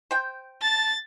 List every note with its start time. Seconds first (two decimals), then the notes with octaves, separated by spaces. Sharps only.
0.11 C5 G5
0.62 A5 A6